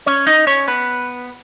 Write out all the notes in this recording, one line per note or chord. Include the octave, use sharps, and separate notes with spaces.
C#4 C#5
D#4 D#5
C#4 C#5
B3 B4